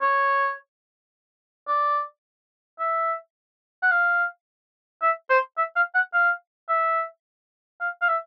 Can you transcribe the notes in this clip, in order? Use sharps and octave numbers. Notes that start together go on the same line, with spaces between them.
C#5
D5
E5
F#5
F5
E5
C5
E5
F5
F#5
F5
E5
F5
F5
E5